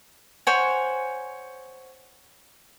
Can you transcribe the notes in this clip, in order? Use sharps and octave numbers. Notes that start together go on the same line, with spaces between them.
C5 C#5 F#5 G#5